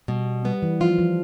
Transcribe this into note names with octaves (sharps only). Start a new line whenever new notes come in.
B2 G3
G3 B3
E3
F3 F4
F3